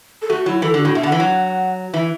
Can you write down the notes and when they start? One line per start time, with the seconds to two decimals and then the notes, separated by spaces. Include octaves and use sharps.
0.22 A4
0.30 A3 F#4
0.46 F#3 E4
0.62 E3 A4
0.74 D3 F#4
0.85 A2
0.95 B2 E5
1.03 D3
1.06 F#5
1.12 E3
1.17 F#3 F#5
1.94 E3 E5